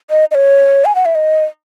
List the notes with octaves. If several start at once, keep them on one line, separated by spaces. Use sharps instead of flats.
D#5
D#5
C#5
G#5
F#5
E5
D#5